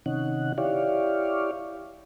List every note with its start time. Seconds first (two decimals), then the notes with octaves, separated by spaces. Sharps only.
0.06 C3 D#3 C#4 D#4 F#5
0.58 E4 G4 C#5 D5 F5